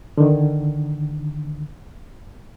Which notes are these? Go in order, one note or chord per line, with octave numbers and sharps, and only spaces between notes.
D3 D#3